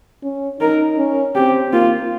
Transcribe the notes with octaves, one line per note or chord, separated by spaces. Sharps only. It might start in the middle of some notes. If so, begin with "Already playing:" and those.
C#4
D#4 A#4
C#4
C4 G4
A#3 F4